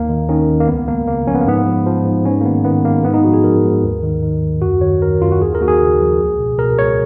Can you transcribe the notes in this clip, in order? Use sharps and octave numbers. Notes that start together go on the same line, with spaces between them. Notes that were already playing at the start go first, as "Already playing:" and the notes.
Already playing: D#2 A#3
D#3
D#3 C#4
D#2
A#3
C#2 B3
C#2 A#3
C#3 A#3
F3 C#4
B3
A#3
G#2 B3
F3
F3
G#2
G#2 C#4
A#3
D#3 B3
D#3 B3
G#2 A#3
G#2 B3
D#4
F3 F#4
G#4
F3 A#4
G#2
D#2
D#3
D#3
D#2
F#2 F#4
D#3 C#5
D#3 A#4
F#2 F4
F#4
D#2 G#4
A#4
D#2 F#4
G#4
C#3
F3
C#2
B2
B2 A#4
C#2 C#5